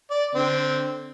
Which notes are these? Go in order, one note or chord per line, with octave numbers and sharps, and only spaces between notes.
D5
D3 C4